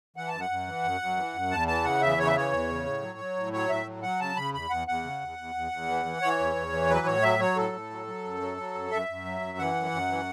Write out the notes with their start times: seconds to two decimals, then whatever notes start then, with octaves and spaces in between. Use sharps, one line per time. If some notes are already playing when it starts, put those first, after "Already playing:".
0.16 E3 F#5
0.28 F#2 A5
0.40 F#5
0.50 F#2
0.67 E3
0.84 F#2
1.01 F#2
1.17 E3
1.34 F#2
1.51 E2 A5
1.67 E3 A5
1.84 C#3 F#5
2.01 E2 E5
2.18 C#3 C#5
2.27 E5
2.36 E3 C#5
2.51 E2
2.69 C#3
2.86 A2
3.02 F#3
3.19 F#3
3.36 A2
3.53 F#3 C#5
3.70 A2 E5
3.86 F#3
4.03 F#3 F#5
4.20 C#3 A5
4.36 C#3 B5
4.53 E2 B5
4.70 E2 F#5
4.87 E2 F#5
5.04 C#3
5.21 E2
5.38 E2
5.55 E2
5.72 E2
5.88 E3
6.05 E3
6.22 E3 C#5
6.39 E2
6.56 E2
6.73 E3
6.89 F#3 B4
7.06 A2 C#5
7.22 F#3 E5
7.39 F#3 C#5
7.56 A2 A4
7.73 A2
7.90 F#3
8.07 F#3
8.24 F#2
8.41 F#3
8.57 F#3
8.74 F#2
8.91 F#2 E5
9.08 F#2
9.25 F#3
9.41 F#2
9.58 E3 F#5
9.75 F#2
9.91 F#2
10.09 E3